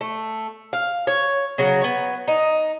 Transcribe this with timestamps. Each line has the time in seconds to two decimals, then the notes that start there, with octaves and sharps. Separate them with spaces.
0.01 A3
0.73 F5
1.07 C#5
1.58 C#3 F#3
1.81 B3 C#5
2.28 D#4